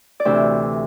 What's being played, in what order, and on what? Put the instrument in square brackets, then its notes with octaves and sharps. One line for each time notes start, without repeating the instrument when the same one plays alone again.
[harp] D5
D2 C3 E3 C5 E5